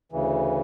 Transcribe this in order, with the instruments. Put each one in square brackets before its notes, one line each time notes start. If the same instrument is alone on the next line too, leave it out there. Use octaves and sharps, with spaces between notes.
[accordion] D2 C#3 E3